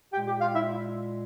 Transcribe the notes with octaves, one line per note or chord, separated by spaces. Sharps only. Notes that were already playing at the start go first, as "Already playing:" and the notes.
A#2 G#3 G4 G5
G4 G5
F4 F5
E4 E5